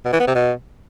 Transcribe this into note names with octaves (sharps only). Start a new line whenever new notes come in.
B2
E3
B3
C3
B2